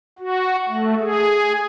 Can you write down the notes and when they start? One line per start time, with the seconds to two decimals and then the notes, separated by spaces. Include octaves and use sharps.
0.19 F#4
0.68 A3
1.01 G#4